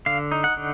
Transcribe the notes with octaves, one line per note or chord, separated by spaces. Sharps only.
D3 F5
D#4
F#5
D3